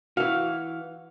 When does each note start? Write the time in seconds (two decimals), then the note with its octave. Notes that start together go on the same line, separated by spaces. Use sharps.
0.17 E3 F#4 F5